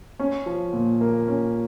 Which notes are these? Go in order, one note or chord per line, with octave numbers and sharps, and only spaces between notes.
C#4
F3
A#2
A#3
C#4